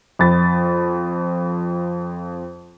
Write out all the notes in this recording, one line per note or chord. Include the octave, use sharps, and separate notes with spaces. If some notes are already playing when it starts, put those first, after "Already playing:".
F2 B5 A6